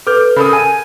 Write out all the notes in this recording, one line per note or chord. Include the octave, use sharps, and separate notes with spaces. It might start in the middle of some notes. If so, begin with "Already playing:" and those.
A4 B4 D6 F6 G6
C#3 A4 A#4 B5 D#6
G#5 D#7